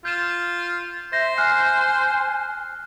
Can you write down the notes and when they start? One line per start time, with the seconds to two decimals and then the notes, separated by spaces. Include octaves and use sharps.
0.05 F4 G6 E7
1.13 C5 E5 A#6
1.38 G#5 F6 F#6 C7